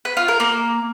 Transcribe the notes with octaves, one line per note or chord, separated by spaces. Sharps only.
B4
F4
A#4
A#3